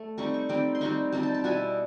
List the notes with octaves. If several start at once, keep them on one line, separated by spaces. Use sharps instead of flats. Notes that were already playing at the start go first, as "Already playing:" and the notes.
Already playing: A3
G3 C4 D#4 C#6
C#6
G3 C4 D#4 D6
C6
G3 C4 D#4 C#6
G3 C4 D#4 A5
A5
A5
B2 G3 B3 E4 G#5